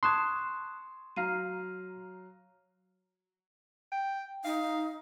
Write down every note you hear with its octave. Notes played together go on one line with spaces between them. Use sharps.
A5 C6 C#6 D#6 F#6 G#6 E7
F#3 F5 A#5 F6 C7 D#7
G5
D#4 F5